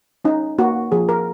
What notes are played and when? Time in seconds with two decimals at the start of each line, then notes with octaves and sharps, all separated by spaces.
0.25 C#4 D#4
0.58 A#3 F#4
0.92 F3 G#4
1.09 A#4